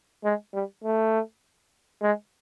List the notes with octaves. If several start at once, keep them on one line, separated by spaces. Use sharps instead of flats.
G#3
G3
A3
G#3